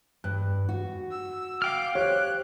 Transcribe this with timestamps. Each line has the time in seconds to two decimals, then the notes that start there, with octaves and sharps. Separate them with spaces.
0.24 G2 F#6
0.69 F#4
1.11 E6
1.62 F5 G5 D6 F6
1.95 G4 C5 C#5 F#6